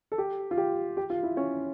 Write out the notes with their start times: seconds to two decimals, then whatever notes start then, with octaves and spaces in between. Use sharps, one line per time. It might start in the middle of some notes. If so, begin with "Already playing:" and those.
0.12 A4
0.18 G4
0.51 F4
0.57 G4
0.97 G4
1.10 F4
1.23 E4
1.37 C#4